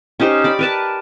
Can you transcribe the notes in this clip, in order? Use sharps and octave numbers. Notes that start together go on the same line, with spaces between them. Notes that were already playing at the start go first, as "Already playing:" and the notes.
C#4 D#4 G4 C5
D5 B5
A#4 B4 A5